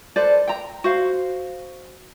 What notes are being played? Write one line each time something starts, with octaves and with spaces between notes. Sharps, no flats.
A4 B4 C5 D5
G5 A#5
F#4 C5 F5